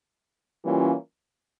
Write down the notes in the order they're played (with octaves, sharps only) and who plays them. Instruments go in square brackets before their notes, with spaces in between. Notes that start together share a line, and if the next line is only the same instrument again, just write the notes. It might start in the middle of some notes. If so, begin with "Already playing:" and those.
[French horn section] E3 G3 A#3 C#4 F4